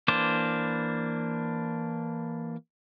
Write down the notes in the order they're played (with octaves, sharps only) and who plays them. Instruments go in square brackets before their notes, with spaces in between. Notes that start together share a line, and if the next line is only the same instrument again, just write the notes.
[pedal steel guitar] E3 A#3 D4 C5 D6